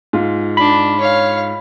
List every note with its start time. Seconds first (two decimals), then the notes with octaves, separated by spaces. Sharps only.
0.13 G#2 F4
0.57 D4 B5
1.00 C#5 F5